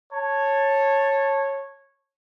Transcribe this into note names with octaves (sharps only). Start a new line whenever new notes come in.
C#5 A5